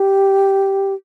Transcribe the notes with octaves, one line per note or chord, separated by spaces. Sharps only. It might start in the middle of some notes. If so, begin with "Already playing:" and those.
Already playing: G4